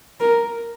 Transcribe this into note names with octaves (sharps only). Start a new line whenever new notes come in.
A#4